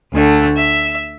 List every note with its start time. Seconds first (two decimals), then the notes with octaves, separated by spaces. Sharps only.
0.12 D2 D3 A3
0.56 E5